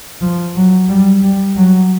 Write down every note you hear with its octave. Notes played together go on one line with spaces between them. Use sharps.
F3
F#3
G3
G3
F#3